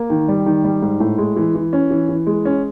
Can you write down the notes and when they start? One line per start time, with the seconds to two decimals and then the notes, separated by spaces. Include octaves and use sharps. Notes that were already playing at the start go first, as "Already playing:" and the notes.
Already playing: A#3
0.10 D#3
0.28 G3
0.46 D#3
0.64 G3
0.82 G#2
1.00 A2
1.18 G#3
1.36 E3
1.55 E3
1.73 C#4
1.91 E3
2.09 E3
2.27 G#3
2.45 C#4